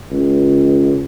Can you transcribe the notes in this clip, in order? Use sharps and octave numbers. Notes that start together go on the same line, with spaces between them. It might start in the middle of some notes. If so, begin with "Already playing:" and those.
C#2